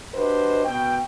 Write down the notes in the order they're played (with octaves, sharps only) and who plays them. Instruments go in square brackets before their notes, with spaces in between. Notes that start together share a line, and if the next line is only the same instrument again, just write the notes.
[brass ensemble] D4 F#4 G4 B4 C5 D#5
B2 G5